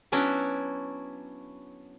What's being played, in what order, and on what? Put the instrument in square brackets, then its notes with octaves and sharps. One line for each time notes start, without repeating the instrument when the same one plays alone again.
[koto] F#3 B3 C#4 D4 E4 F#4